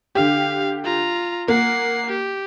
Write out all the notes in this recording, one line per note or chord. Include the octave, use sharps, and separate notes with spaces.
D3 G4 F5
F4 A#5
A#3 F#5 C7
G4